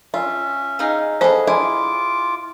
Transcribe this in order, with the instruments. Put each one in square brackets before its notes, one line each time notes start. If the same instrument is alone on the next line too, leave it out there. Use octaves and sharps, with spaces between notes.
[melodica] C#4 E5 [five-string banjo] F4
[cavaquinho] D#4 G#4 F5
[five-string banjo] B3 A4 [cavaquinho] G#4 D#5 [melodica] B4 [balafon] C5
[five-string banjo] E4 G#5 [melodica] F4 D6